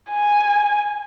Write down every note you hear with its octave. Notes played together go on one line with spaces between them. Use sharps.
G#5